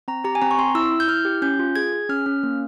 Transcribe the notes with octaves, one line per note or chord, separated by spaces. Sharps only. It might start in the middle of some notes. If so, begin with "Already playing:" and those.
C4 A#5
G4 A#5
G#5
C4 A#5
C#6
C4 C6
E4 E6
E4
G6
E4 F6
G4
C#4 G6
F4
G#4 G#6
G#4
C#4 F6
C#4
A#3